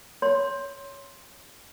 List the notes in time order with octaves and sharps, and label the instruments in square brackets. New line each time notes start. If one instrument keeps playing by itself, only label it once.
[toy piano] C#5 C6